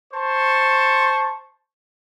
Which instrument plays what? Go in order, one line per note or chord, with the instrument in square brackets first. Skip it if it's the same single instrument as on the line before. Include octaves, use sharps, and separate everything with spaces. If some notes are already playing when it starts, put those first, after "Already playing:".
[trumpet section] C5 A5 C#6